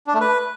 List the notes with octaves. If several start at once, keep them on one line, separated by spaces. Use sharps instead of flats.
D4
A3
B4